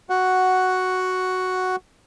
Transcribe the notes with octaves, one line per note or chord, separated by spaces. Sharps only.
F#4 F#5